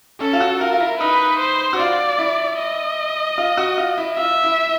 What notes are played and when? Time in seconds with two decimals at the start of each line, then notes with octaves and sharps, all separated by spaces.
0.21 C#4 A4
0.33 F4
0.40 F#4
0.61 F4 A#4
0.73 F4
0.80 E4
1.00 D#4 B4
1.40 C5
1.73 F#4
1.79 F4 D5
2.18 E4
2.59 D#5
3.38 F4
3.57 F#4
3.78 F4
3.97 E4
4.17 F4 E5
4.44 E4